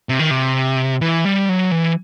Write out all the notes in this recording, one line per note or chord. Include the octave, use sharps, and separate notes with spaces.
C3
D#3
C3
E3
G3
F#3
E3